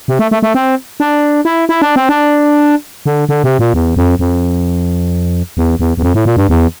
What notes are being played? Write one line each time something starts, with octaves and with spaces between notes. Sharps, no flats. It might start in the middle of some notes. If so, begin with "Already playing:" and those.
C3
A3
A3
A3
C4
D4
E4
E4
D4
C4
D4
D3
D3
C3
A#2
E2
F2
F2
E2
E2
E2
F2
A2
A#2
G2
E2